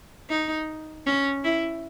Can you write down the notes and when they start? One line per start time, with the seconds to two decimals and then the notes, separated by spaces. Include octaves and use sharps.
0.29 D#4
1.06 C#4
1.44 E4